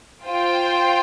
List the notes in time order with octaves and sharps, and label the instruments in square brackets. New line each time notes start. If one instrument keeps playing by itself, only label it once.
[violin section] F4 C5 G5